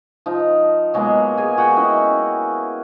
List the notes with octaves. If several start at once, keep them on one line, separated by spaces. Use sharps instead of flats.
F3 D#4
F#3 G#3 A#3 B3
G#4 G#5
F#4 F#5 G5
C#4 E4 D#5